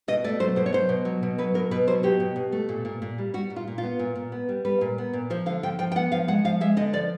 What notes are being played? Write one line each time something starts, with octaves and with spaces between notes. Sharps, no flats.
B2 D#5
A3 D5
F#3 C5
B2 C5
C#5
F#3 C5
B2
F#3
B2
F#3 B4
B2 A#4
B2 B4
F#3 C5
B2 G4
B2
B2
A3
A#2
A#2
A#2
G3
G3 F#4
A#2
F4
A#2
F4
B3
A#2
A#2
B3
G3
G3 B4
A#2
B3
A#2
F3 C5
D3 F5
F3 G5
F3 G5
G5
B3 F#5
F3 F5
G#3 F#5
F3 F5
G#3 E5
D3 D#5
F3 D5